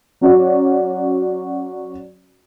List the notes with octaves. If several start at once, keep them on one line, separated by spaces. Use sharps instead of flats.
F#3 C#4 F#4 D5